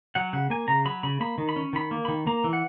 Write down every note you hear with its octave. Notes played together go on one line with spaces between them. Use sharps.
F#3 F#5
C#3 F#5
A#3 G#5
C#3 A#5
F#3 B5
C#3 B5
A#3 B5
D#3
B5
C#4
D#3 B5
A#3
D#3 B5
A#3 A#5
E3
F#5